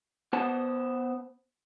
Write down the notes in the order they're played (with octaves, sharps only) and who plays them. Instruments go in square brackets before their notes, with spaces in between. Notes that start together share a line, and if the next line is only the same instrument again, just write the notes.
[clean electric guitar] B3 C5 F#5 A5